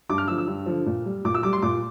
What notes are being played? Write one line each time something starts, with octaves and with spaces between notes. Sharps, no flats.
G2 D6
F6
D3 F3 E6
E6
G2
D3 F3
A#2
G3
A#2 D6
E6
G3 D6
C6
A#2 D6